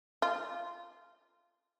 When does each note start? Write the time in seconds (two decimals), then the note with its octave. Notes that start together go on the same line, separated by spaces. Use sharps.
0.22 F4